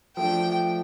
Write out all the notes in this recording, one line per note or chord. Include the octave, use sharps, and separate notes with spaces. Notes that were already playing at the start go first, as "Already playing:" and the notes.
F3 A3 D4 G5